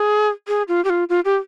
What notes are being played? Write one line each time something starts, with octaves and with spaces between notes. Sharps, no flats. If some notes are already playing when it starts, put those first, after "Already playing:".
Already playing: G#4
G#4
F4
G4
F4
F4
G4